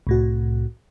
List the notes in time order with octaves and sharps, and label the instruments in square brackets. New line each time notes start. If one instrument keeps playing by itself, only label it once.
[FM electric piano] C2 A2 F#4